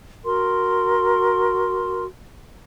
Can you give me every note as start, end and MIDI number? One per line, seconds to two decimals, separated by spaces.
0.24 2.04 66
0.24 2.04 70
0.24 2.04 84